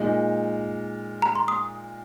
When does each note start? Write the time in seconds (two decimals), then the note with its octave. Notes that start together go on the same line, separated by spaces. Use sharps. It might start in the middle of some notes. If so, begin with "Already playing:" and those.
Already playing: A#2 G#3 D#4
1.22 A#5
1.35 C6
1.48 D#6